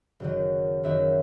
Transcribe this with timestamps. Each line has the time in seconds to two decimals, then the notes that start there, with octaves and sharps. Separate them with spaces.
0.20 F#1 F#2 D#3 F#3
0.83 F#1 F#2 D#3 F#3 E5